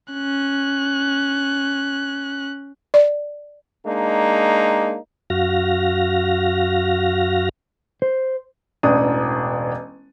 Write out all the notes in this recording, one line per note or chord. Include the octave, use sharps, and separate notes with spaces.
C#4 F#6
D5
G#3 A#3 D4 D#4
F#2 F#4 F5 A#6
C5
E1 A1 D4 D#6